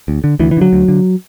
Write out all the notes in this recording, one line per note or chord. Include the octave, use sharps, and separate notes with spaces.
D2
D3
D2 E3
E3
D3 F#3
D2
D3